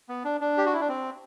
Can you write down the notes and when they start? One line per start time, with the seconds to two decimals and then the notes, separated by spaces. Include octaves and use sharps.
0.09 B3
0.25 D4
0.41 D4
0.57 G4
0.66 F#4
0.73 E4
0.81 D4
0.89 C4